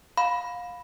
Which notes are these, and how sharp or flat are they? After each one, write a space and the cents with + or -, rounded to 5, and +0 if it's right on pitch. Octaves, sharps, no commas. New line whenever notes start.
F5 +25 B5 +0